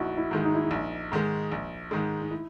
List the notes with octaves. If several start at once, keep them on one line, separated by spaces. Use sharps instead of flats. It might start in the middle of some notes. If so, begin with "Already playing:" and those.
Already playing: A#1 D#4 E4 F#4
E4
G#2 D#3 G#3
D#4
E4
D#4
A#1
G#2 D#3 G#3
A#1
G#2 D#3 G#3
D#4
E4